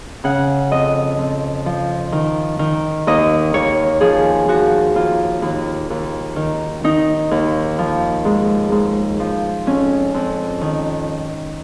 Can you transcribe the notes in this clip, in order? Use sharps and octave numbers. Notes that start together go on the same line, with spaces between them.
C#3 F#5
F2 D#5
F2
F3
D#3
D#3
D#2 D#5
D#2 C#5
F3 G#4
F3 F#4
D#2 F4
D#2
D#2
D#3
D#3 D#4
D#2
F3
G#2
G#2
F3
F2 C#4
F2
D#3